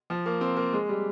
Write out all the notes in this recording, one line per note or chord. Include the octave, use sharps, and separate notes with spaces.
F3
A#3
C4
A#3
G#3
G3